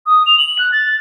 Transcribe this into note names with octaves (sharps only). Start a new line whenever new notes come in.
D#6
F7
F#7
F#6
A6